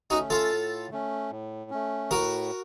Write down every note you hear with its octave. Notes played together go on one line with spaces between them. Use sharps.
A3 C#4 D#4 F#4
F4 A4
A2
A3 C#4
A2
A3 C#4
A2 F#4 A#4